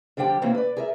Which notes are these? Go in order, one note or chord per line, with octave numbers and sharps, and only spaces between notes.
F2 D3 G3 G4 G5
B2 E3 A3 A#3 C4 C#4
B4 D5
G#4 A#4 E5